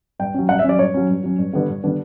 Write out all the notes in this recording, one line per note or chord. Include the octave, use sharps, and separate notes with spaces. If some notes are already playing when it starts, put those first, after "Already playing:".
G2 G5
F#3 C#4
G2 F#5
E5
F#3 C#4 D5
G2 C#5
F#3 C#4
G2
F#3 C#4
G2
D3 G3 B3 D4
G2
D3 G3 B3 D4